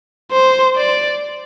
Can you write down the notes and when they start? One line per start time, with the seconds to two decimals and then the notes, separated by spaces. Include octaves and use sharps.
0.32 C5
0.76 D5